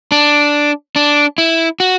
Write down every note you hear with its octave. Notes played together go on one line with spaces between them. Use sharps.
D4
D4
E4
F#4